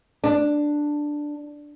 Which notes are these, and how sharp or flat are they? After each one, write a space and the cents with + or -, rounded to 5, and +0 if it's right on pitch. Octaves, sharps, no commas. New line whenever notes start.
D4 +5